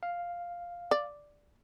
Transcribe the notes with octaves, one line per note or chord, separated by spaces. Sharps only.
F5
D5